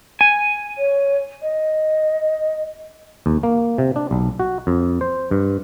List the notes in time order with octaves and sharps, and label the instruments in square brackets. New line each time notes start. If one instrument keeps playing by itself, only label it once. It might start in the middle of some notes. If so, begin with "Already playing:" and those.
[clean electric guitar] G#5
[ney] C#5
D#5
[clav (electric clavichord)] D#2
A#3
C3
D4
B1
F#4
F2
C5
G2